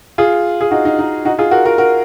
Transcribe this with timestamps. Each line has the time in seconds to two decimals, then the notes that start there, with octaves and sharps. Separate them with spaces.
0.18 F4 G#4
0.61 G#4
0.71 D#4 F#4
0.85 D#4
0.99 D#4
1.25 D#4 F#4
1.39 F4 G#4
1.51 F#4 A#4
1.65 F#4 A#4
1.78 F#4 A#4